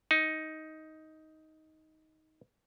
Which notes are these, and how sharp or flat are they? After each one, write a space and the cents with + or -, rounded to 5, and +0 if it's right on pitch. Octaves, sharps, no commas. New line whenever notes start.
D#4 +10